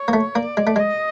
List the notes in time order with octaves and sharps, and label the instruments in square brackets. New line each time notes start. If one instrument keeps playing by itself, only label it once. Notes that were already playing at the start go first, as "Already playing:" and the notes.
Already playing: [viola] C#5
[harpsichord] A#3
A3
[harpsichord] A#3 [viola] D5
[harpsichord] G#3
A3
[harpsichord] G#3 [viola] D#5